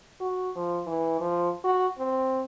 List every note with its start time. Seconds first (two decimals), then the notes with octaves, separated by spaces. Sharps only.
0.20 F#4
0.56 F3
0.86 E3
1.20 F3
1.64 F#4
1.99 C4